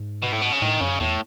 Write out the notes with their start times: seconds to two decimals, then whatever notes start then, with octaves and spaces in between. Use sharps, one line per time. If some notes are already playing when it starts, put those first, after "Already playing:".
Already playing: G#2
0.22 B2
0.32 A2
0.41 B2
0.52 C#3
0.62 A2 D#3
0.80 F#2 C#3
1.00 E2 A2